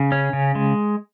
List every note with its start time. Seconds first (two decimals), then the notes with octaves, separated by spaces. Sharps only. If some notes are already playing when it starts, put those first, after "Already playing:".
Already playing: C#3
0.12 C#4
0.33 C#3
0.55 G#3